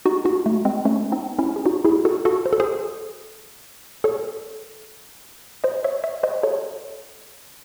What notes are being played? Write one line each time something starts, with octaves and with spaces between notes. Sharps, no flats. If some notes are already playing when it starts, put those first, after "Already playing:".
D#4 F#4
D#4 F#4
A3
G#3 C4
A3 C#4
C4 D#4
C#4 E4
G#4
D#4 F#4
E4 G#4
F#4 A4
F#4 A4
C5
A4
G#4 C5
A4 C#5
C5 D#5
C#5 E5
C#5 E5
C5 D#5
A4 C#5